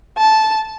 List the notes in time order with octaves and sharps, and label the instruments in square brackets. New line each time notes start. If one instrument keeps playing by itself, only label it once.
[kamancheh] A5